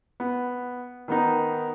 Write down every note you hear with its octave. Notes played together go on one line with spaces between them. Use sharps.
B3
D#3 B3 D#4